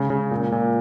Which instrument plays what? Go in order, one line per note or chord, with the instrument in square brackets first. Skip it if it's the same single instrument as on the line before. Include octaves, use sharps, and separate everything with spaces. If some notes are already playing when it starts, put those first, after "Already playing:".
Already playing: [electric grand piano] C#3 [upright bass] G#3
[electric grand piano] C#3
A#2
A#2